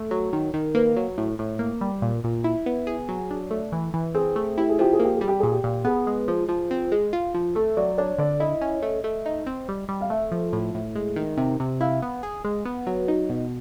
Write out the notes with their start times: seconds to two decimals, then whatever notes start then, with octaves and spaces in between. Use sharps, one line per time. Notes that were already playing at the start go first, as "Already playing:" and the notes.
Already playing: A3
0.11 F#3
0.33 D#3
0.54 D#3
0.75 A#3 B4
0.97 F#3
1.18 A2
1.39 A2
1.59 A#3
1.81 G3
2.02 A#2
2.24 A#2
2.44 E4
2.66 B3
2.87 G#4
3.09 F#3
3.30 D4
3.51 A3
3.72 E3
3.94 E3
4.14 C4 G#4
4.36 A3
4.57 E4 G4
4.69 G#4
4.79 F3 G4
4.93 G#4
4.99 A#3 G4
5.15 G#4
5.21 G3
5.28 G4
5.40 A#2 G#4
5.52 G4
5.64 A#2
5.85 B3 G#4
6.07 G#3
6.28 F3
6.49 F3
6.71 C4
6.92 G#3
7.13 F4
7.35 F3
7.55 A3 A4
7.77 F#3 D5
7.98 D4 C#5
8.18 D3 D5
8.40 E4 D#5
8.61 C#4
8.82 A3
9.04 A3
9.26 D#4
9.47 C4
9.69 G3
9.89 G3
10.01 F5
10.10 A3 E5
10.32 F3
10.53 A2
10.75 A2
10.96 G#3
11.16 D#3
11.37 C3
11.60 C3
11.81 E4 F5
12.02 B3
12.23 G#4
12.45 G#3
12.65 B3
12.87 F#3
13.08 D#4
13.30 B2